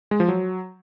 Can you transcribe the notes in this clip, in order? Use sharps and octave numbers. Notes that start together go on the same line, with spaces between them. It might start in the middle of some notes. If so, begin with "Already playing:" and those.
G#3
F3
F#3